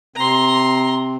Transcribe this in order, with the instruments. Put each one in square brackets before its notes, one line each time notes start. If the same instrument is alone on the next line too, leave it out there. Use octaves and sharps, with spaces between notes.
[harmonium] C3 C4 [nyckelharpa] A#5 C6